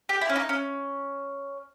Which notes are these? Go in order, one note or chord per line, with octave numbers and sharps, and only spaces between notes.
G4
E4
C#4
D#4
C#4